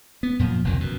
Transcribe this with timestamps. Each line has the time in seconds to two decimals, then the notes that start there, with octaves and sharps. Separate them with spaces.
0.23 B3
0.39 F#2 A#2 F3
0.64 F1 C2 F2 D#3
0.80 F#2 B2